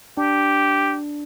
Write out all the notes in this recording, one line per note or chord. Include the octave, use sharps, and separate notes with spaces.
D4 G4